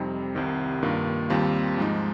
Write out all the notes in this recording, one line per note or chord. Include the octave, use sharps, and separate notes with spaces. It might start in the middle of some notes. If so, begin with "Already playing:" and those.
Already playing: F2 C3 G3 C4 D#4
C2 C3 D#3
G2 D#3 A#3 F4
D#2 D#3 G3 C4 F4
G#2 F3 G#3 D#4